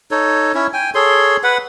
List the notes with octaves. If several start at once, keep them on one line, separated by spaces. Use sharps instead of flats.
D#4 A4 C#5
C#4 E4 C#5
G5 G#5
G#4 A4 C#5 C6
B4 F#5